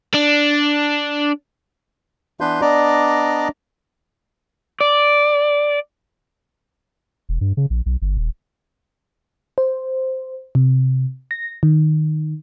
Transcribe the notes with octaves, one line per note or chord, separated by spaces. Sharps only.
D4
E3 B3 D4 B4 C6 G6
B3 D4 D5 D#5 A#5 D6
D5
E1
G2
C#3
A#1
B1
G1
D#1
C5
C3
A#6
D#3